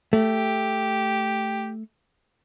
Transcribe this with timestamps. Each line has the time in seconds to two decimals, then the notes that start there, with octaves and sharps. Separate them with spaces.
0.13 A3 G4